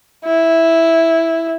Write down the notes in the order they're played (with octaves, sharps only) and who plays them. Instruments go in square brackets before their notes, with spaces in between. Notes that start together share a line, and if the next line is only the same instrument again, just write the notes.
[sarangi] E4